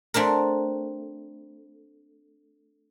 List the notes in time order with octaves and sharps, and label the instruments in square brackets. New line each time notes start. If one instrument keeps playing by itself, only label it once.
[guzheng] A3 C4 D4 A#4